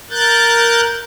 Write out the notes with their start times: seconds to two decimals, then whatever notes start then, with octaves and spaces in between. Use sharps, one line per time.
0.10 A#4 F#6 G6 A6